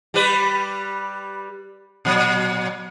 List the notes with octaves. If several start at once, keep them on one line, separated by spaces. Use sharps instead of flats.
G3 G4 B4
A#2 F#3